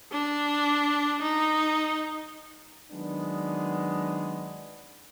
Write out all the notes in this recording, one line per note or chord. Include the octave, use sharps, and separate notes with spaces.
D4
D#4
D#3 F#3 G#3 B3 D4